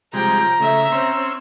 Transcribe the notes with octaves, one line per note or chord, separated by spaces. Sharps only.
C3 F3 G3 G#3 G5 A#5
C#3 A3 E5
C4 C#4 C5 E6